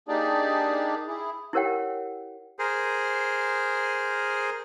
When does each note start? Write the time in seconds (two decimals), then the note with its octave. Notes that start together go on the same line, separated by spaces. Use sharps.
0.08 A#3 D4 D#4 G4 G#4 D5
1.07 E4 G#4
1.53 E4 G4 A#4 C#5 F#5 G5
2.59 G#4 A#4 C5